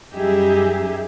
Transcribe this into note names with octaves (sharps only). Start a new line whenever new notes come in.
F#2 G3 D#4 G4 G#4 E5